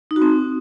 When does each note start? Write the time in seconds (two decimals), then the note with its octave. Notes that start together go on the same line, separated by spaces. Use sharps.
0.11 D#4
0.16 F#4
0.22 C4